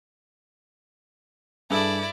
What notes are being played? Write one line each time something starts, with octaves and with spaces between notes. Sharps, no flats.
G2 E4 G#4 A4 D5